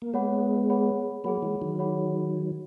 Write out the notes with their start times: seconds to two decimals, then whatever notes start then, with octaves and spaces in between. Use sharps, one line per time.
0.02 A#3
0.14 G#3 B3 G#4 C#5 F#5 B5
0.70 G#4 C#5 F#5 B5
1.24 F#3 A#3 G#4 C#5 F#5 B5
1.42 E3 G#3
1.61 D#3 F#3
1.79 G#4 C#5 F#5 B5